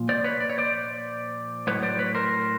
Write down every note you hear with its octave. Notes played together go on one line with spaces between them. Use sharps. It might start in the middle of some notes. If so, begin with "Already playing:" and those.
Already playing: A#2 F3
C5 D5
B4 C#5
D5
C#5
C5 D5
A2 F#3 B4 C#5
C5 D5
B4 C#5
A#4 C5